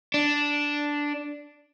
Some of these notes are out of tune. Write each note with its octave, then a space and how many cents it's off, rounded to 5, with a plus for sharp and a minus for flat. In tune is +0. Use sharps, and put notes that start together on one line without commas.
D4 -5